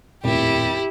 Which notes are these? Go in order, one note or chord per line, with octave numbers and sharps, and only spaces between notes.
D#1 F2 A2 G3 E4 G4